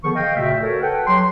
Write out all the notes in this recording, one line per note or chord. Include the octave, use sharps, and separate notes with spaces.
D3 D#3 F3 B3 G#4 C#6
D#5 F5 G5
A#2 C#3 A3 F#4 E5
F#4 A4 A#4 C#5
A4 B4 F#5 G5
F#3 G4 C6